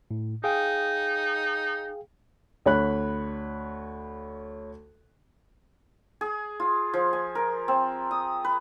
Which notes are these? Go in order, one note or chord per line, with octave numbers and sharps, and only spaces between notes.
A2
D#4 G#4 F5 G5
D2 C#5 B5 F#6
G#4
F4
F3
G#5
A#4
C4
D#6
B4